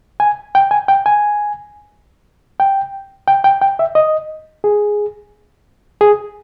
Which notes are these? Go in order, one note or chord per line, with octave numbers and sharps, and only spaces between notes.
G#5
G5
G#5
G5
G#5
G5
G5
G5
G5
E5
D#5
G#4
G#4